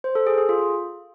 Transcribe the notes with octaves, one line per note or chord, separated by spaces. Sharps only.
C5
A4
G#4
G#4
F4